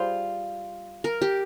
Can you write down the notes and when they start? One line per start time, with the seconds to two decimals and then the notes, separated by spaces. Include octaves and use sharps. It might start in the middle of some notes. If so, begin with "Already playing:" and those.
Already playing: G3 F4 G#4 C5
1.04 A#4
1.22 G4